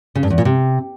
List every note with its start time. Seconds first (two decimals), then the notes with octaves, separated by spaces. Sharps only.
0.15 C#3
0.23 G2
0.30 E2
0.38 A#2
0.45 C3